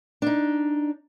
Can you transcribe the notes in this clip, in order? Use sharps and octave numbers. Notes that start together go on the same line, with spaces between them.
D4 D#4